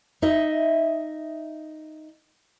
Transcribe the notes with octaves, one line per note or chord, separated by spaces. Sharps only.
D#4 D#5 E5